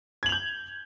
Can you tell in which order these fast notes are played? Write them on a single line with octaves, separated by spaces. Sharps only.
G#6 F#7 F7 G6